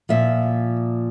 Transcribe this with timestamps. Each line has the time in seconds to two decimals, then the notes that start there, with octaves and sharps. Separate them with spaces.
0.09 A#2 F3 E5